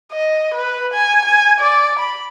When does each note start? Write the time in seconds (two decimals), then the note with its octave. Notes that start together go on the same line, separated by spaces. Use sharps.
0.12 D#5
0.54 B4
0.94 G#5
1.25 G#5
1.60 D5
1.99 B5